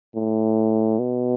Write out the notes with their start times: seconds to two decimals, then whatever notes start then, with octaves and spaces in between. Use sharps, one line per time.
0.15 A2
0.99 B2